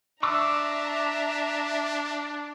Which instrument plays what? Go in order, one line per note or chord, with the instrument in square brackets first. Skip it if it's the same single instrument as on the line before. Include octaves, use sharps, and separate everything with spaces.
[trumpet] D4 [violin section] E5 A#5 [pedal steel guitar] C#6 D6 E6